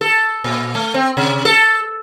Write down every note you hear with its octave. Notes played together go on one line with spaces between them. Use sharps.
A4
A#2
A3
C4
C3
A4